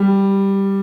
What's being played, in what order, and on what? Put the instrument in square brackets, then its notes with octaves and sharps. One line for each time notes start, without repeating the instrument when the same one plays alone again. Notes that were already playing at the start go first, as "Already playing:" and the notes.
Already playing: [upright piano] G3